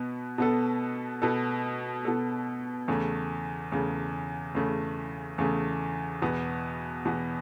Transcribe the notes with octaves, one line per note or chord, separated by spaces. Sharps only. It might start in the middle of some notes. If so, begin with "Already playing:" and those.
Already playing: B2 B3
B2 B3 A4
B2 B3 A4
B2 B3 A4
E2 C#3 A3
E2 C#3 A3
E2 C#3 A3
E2 C#3 A3
E2 B2 B3
E2 B2 B3